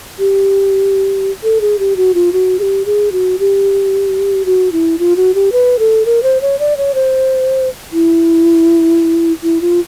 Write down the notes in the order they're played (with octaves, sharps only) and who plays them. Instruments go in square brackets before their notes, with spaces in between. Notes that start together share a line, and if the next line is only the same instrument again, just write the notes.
[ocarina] G4
A4
G#4
G4
F#4
F4
F#4
G#4
G4
G#4
F#4
G4
F#4
E4
F4
F#4
G4
B4
A4
A#4
C5
C#5
D5
C#5
C5
E4
E4
F4